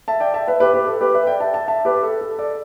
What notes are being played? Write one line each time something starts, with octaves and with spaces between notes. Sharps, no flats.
E5 A5
D5 G5
E5 A5
B4 E5
G4 B4
G4 B4
A4
G4 B4
B4 E5
D5 G5
E5 A5
E5 A5
E5 A5
G4 B4
A4
A4
A4 D5